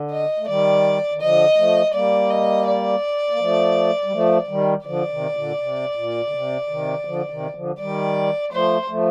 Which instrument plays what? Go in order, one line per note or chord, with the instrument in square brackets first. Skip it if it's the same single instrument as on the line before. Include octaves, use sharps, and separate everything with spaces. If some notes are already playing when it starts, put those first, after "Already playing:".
Already playing: [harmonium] D3
[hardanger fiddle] D#5
[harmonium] A3
[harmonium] D#3 G3 [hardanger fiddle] D5
[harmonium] D#3
[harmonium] D3 F3 [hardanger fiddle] D#5
[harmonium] F3 A3
[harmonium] G3 A#3 [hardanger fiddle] D5
[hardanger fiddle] D#5
D5
[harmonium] A#3
F3 A3
G3
F3 A3
D#3 G3
[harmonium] D3 F3 [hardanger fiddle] D5
[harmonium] C3 D#3
C3
A#2 D3
C3
A#2
D3
C3
C3 D#3
D3 F3
C3 D#3
D3 F3
[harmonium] D#3 G3 [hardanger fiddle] D5
[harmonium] F3 A3 [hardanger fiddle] C5
[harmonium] F3 A3